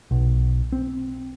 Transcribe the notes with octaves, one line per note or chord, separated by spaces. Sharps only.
B1
C4